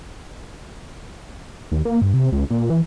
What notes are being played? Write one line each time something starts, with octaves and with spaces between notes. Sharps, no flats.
D#2
A#3
G2
C3
C#2
A#2
E3